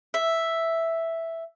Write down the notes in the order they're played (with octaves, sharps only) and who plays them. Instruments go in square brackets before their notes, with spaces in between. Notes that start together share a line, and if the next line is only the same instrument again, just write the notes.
[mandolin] E5